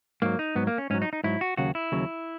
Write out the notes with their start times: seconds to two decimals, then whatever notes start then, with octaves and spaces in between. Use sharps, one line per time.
0.22 G#2 F#3 A#3
0.39 D#4
0.55 G#2 F#3 B3
0.67 A#3
0.78 C#4
0.90 G#2 F#3 C#4
1.02 D#4
1.13 D#4
1.24 G#2 F#3 E4
1.41 F#4
1.57 D#2 C#3 F#3 F#4
1.75 E4
1.92 D#2 C#3 F#3